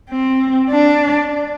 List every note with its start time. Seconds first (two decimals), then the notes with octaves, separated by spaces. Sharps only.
0.11 C4
0.71 D4